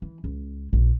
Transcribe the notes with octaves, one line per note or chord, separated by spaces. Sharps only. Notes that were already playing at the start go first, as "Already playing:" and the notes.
E3
C#2
A#1